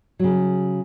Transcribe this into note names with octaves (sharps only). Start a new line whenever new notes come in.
C#3 F#3